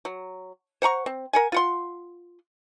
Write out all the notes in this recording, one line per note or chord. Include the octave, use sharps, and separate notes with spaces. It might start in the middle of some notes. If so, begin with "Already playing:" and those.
F#3
C5 F#5 A#5 C#6
C4
A#4 F#5 G#5
F4 F#5 C6